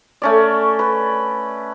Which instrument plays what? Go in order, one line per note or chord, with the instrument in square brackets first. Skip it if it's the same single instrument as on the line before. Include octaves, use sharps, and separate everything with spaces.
[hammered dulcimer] A3 C#4 D5
B4